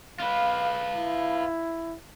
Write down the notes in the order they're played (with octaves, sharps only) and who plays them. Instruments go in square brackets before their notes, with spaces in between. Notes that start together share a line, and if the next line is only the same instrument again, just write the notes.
[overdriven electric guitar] F4 B4 [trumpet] F5
[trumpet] E4